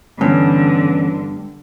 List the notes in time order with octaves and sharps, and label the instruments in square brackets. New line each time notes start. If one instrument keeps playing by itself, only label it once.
[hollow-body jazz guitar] G2 [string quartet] D3 [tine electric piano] E3 B3 C#4